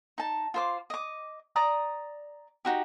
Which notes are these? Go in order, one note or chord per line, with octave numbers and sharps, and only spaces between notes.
D#4 A5
F4 C5 D6
D#5 D6
D5 A#5 D#6
D#4 F#4 G4